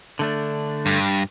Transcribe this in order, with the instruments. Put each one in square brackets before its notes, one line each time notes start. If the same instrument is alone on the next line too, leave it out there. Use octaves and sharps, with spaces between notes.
[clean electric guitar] D3 A3 D4
[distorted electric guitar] G2